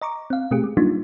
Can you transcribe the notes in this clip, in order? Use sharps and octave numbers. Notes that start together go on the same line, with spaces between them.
D#5 A#5 C#6 D6
C4 F5
B2 A3 C4 G4 G#4
G#3
F#3 G3 A#3 D4 D#4 F4